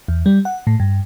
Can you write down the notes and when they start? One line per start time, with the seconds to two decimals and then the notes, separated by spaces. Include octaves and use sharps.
0.08 E2
0.26 G3
0.45 F#5
0.67 A2
0.80 G2